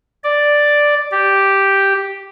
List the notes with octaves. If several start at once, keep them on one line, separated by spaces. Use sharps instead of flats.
D5
G4